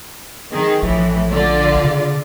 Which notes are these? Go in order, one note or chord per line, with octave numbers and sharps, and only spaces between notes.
D#3 G#4
A#1 A2 E3 F3
D3 F4 D5
C#3